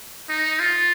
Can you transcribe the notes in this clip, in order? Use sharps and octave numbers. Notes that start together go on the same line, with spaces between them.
D#4
F4